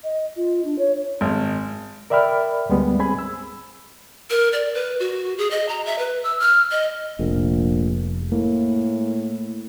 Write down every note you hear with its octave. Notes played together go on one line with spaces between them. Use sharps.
D#5
F4
D4
C#5
G#1
A#4 D5 E5 G5 B5 F6
D2 G3 G#3 B3
C4 G#4 G#5 B5 G#6
E6
A#4
D5
B4
F#4
G#4
D#5
A#5
E5
B4
E6
F6
D#5
F1 A#1
A2 A#3